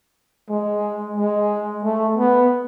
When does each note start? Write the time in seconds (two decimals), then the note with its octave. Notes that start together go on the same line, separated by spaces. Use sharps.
0.50 G#3
1.17 G#3
1.84 A3
2.18 B3